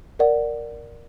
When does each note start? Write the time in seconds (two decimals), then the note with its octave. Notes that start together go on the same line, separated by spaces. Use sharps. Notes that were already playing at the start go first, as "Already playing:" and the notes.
0.19 A#4 D5 F#5